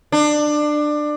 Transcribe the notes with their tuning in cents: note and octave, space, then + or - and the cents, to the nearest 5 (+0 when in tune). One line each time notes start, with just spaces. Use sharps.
D4 +20